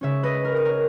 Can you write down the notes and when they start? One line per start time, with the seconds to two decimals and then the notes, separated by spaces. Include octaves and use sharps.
0.01 C#3 G#3 C#4 C#5 E5
0.23 B4 D#5
0.45 A#4
0.57 D#5
0.65 A#4 C#5